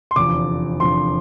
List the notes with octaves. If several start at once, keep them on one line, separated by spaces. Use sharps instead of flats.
C6
F1 E2 D3 F3 D6
F1 E2 D3 F3 C6